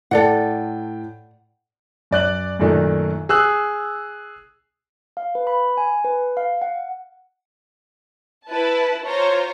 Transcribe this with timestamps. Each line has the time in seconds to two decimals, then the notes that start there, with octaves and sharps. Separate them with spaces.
0.11 A2 A4 D5 F#5 G5
2.11 F#2 D5 F#6 F#7
2.59 F#2 A#2 D#3 A3 D4
3.29 G#4 E6 F#6
5.17 F5
5.35 B4
5.47 B5
5.77 G#5
6.04 B4
6.37 F5
6.62 F#5
8.47 E4 B4 A5
9.05 F4 C5 C#5 A#5